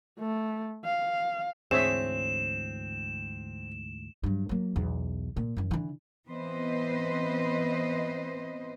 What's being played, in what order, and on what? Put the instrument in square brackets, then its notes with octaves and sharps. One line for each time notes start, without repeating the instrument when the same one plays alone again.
[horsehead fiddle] A3
F5
[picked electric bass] D2 G#2 E3 [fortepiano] C4 [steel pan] G#4 C#5 E5 [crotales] E7
[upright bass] G2 F#3
F#3 A#3
B1 E2
A#2
F#2 E3
D3 E3
[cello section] E3 B3 C4 B4 C5 D#5